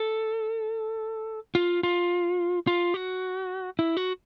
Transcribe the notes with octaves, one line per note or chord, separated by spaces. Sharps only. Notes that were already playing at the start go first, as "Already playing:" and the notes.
Already playing: A4
F4
F4
F4
F#4
E4
F#4